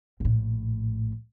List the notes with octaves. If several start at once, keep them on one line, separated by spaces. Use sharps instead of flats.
A#1 A2